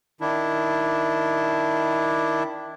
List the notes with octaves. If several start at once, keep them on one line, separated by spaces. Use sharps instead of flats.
D#3 D4 E4